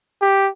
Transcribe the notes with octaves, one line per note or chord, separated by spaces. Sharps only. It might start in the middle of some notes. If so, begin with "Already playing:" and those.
G4